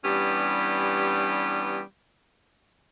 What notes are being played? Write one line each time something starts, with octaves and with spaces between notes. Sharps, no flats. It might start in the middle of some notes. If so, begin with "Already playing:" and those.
E3 G3 B3 C#4 D4 G4